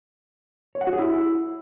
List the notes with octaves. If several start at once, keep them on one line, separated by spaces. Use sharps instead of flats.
C#5
F#5
F#4
G#4
E4